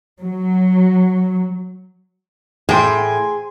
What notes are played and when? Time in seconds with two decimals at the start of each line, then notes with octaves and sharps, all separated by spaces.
0.21 F#3
2.69 A2 G#4 G5 G#5 C6